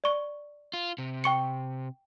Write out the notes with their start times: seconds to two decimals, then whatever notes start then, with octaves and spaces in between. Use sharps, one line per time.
0.04 D5 C#6
0.73 F4
0.98 C3
1.24 G5 C#6 C#7